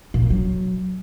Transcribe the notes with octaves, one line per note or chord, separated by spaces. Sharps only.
A#2
E3
F#3